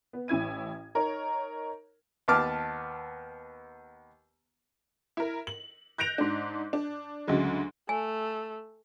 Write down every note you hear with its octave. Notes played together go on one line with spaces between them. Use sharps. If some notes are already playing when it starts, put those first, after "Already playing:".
B3
A1 C#4 E4 G#6 D#7
D#4 A#4 C#5
D#2 B3 A5 D6 F6
E4 A#4
F#7
F#6 G6 A#6 D7 F7
G#2 D4
D4
D2 C#3 F#3 G#3
A3 G#5